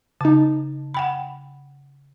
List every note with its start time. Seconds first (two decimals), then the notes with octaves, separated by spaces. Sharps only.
0.21 C#3 D#4 A5
0.94 F#5 G5 B5